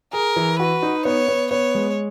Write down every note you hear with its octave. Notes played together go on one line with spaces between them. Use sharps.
G#4 A#4
E3
F#4 B4
D#4
B3 C#5
B3
B3 C#5
G#3